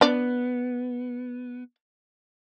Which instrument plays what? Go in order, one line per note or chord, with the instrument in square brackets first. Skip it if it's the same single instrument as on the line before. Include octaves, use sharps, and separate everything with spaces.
[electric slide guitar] B3 [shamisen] D4 D5